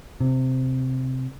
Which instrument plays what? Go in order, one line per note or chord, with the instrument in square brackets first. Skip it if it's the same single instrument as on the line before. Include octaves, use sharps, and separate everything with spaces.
[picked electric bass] C3